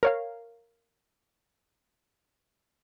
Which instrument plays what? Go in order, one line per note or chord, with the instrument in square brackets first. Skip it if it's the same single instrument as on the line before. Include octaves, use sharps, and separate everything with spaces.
[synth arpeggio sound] A#4 C#5 F5